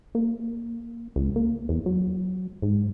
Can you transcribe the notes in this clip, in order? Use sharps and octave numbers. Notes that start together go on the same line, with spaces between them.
A#3
C#2
A#3
E2
F#3
G#2